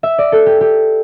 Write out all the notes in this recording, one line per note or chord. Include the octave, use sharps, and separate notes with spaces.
E5
D5
A4
G4
G4